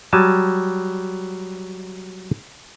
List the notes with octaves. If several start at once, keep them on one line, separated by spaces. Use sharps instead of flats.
F#3 G3 G#5 A5